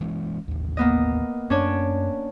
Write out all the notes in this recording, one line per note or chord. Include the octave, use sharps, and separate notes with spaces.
E3 G#3 C#4
A1 D#2
A#3 B3 D#5
F#2 C#4 D4 C#5